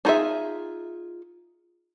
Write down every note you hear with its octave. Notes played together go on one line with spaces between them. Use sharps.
D4 D#4 F4 G#4 E5